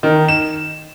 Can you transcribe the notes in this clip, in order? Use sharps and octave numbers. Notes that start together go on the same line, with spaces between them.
D#3
E7